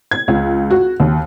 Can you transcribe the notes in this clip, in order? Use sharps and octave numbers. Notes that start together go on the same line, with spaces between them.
G#6
C#2
F#4
D#2